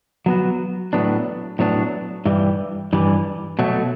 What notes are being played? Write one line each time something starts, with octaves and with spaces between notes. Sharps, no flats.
F#3 B3 F#4
A2 F#3 B3 D4
A2 F#3 B3 D4
G2 E3 G3
G2 E3 G3
B2 F#3 A3